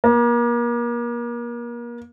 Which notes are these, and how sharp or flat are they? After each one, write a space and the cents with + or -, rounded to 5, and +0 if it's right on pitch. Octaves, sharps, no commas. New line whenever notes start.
A#3 +35